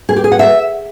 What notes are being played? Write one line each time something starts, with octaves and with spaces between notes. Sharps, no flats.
G#4
G4
G#4
F#5
E5